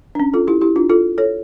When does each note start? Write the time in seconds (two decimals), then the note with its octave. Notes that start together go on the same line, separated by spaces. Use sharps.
0.15 D4
0.20 C#4
0.34 F4 A4
0.47 E4 G4
0.61 E4 G4
0.76 D4 F4
0.90 F4 A4
1.18 A4 C#5